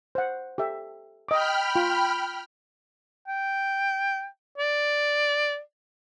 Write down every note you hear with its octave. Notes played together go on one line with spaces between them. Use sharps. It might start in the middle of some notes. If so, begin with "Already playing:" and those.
C5 F#5
G4 A4 E5
D#5 G5 B5 D6 F6
F4
G5
D5